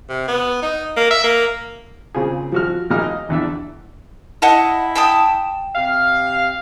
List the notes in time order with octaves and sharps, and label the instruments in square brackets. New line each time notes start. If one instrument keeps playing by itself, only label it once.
[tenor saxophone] C3
B3
D#4
A#3
E5
A#3
[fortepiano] A#2 C#3 C4 F4 G#4
F3 F#4 F6
A#1 A#2 A#3 D#4 A#5 F6
D#5
A#1 E2 D4 E5
[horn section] E4 [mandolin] D#5 F#5 A5
[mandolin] G5 A5 D#6
[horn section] C3 G4 F5